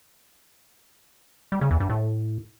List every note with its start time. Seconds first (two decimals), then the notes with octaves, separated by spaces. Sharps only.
1.52 G3
1.61 C#3
1.71 E2
1.80 G2
1.90 A2